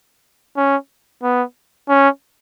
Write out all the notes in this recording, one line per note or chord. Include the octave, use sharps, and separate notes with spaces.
C#4
B3
C#4